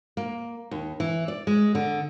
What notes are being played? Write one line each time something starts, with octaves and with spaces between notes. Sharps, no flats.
A#3
D#2
E3
D5
G#3
D3